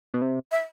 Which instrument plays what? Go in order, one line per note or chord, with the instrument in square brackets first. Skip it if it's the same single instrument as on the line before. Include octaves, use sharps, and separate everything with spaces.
[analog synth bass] B2
C3
[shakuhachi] E5